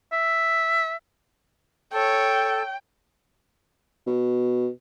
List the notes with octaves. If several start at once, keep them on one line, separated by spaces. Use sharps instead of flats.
E5
A4 C#5 G5 A5
B2